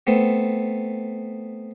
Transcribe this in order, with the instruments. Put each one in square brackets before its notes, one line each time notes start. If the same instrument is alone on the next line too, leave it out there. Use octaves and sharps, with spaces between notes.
[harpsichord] A3 B3 C4